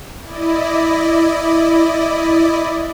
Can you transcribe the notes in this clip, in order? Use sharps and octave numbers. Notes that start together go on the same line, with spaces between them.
E4 D5 D#5